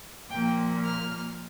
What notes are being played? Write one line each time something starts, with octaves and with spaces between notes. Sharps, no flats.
A#2 F3 A#3 G5
F6